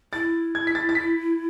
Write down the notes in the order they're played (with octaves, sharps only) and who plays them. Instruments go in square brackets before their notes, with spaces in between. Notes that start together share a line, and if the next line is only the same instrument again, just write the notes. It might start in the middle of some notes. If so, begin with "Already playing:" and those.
[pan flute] E4 [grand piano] A6
[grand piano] G#6
B6
A6
A6
B6